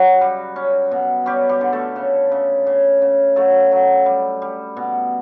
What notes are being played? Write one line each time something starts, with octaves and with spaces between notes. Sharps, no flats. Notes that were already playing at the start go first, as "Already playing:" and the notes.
Already playing: C#3 F#3 F#4
G3
C#4
B2
G3 C#4 G4
G3 G4
D3
A3 A4
C#3
C#3
C#3
C#3
F#3 A3 A4
F#3
G3
G3
B2